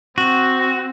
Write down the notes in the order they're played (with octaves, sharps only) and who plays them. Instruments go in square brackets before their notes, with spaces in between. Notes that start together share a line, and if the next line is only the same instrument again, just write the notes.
[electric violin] C4 [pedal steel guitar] F#4